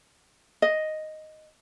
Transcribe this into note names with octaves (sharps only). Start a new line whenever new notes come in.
D#5